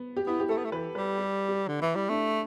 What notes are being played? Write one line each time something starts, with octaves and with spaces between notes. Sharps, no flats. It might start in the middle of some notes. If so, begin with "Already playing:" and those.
Already playing: B3
G4
B3 E4
G4
A3 A4
B3
A3
E3 B4
G3 B4
G4
G4
D3
E3 E4
G3
A3 D4